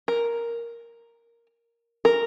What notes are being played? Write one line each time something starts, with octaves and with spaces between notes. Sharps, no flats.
A#4
A#4